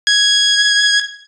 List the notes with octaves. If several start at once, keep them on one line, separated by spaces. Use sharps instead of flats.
G#6